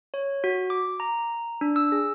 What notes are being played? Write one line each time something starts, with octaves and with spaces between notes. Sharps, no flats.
C#5
F#4
D6
A#5
D4
E6
G#4